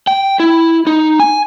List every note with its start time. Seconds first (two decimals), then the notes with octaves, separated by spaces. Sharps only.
0.07 G5
0.40 E4
0.87 D#4
1.20 G#5